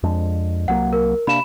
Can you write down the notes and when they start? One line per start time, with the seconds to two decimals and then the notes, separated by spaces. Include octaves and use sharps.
0.03 F2 G#3 D4
0.68 C2 F#3 A#3 F#5
0.93 A#4
1.27 C3 A#3 D4 B5 E7